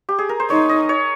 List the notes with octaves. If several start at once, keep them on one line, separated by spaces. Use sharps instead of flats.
G4
G#4
A#4
C5
D#4 C#5
D#5
C#5